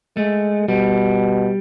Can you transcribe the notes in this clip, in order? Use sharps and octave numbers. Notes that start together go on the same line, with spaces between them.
G#3 A3
B2 G3